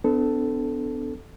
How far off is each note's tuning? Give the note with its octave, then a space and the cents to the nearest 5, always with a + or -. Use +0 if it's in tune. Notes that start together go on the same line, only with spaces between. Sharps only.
B3 +40 D4 +5 A4 +0